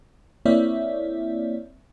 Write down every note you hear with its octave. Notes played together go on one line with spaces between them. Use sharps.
A#3 C4 E4 C#5 D5 E5